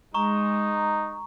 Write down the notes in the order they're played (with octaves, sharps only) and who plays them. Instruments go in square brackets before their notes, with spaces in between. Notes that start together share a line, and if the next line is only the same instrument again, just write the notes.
[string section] G#3 [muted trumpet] D#4 [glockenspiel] A#5 C#6